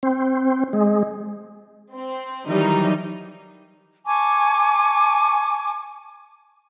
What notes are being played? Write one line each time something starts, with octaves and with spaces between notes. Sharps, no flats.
C4
G#3
C4
D#3 E3 F#3 G3 D#4
G#5 A5 C#6 D6